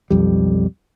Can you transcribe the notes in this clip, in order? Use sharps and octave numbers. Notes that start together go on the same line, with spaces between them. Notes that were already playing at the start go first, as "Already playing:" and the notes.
B1 F2 G3